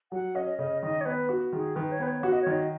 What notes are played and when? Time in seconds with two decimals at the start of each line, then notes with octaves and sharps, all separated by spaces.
0.12 F#3 F#5
0.35 C#4 D#5
0.58 C#3 D#5
0.82 D#3 D#5
1.01 C#5
1.05 B3 B4
1.29 F#4
1.53 D#3 G#4
1.76 D#3 B4
1.92 C#5
2.00 B3 B4
2.07 C#5
2.23 F#4 F#5
2.33 D#5
2.42 D#3 C#5
2.52 D#5